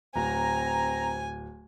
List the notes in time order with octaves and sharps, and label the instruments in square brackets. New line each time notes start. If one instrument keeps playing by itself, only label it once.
[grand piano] D1 [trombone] C4 [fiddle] G#5 [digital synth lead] A#5